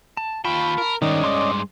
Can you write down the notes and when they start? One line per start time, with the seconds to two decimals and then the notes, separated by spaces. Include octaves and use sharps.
0.17 A5
0.45 D#2 F4 G5 A5 B5 C#6
0.78 A#4
1.02 G2 D#3 G#3 C#4 D5 D#5
1.24 C6 D6